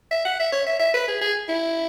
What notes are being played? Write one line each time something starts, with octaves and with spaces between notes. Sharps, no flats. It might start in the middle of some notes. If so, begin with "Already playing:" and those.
E5
F#5
E5
C#5
E5
E5
B4
G#4
G#4
E4